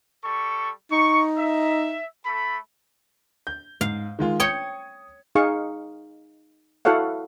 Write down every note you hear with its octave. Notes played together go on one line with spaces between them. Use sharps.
G3 A4 C#6
D#4 C#6
E5
A3 A4 B5
G6
G#2 F5
D#3 G#3 F4
C#5 G5 D#6 G#6 C#7
D#4 G#4 F5 C#6
E4 F#4 A4 C#5 F5 F#5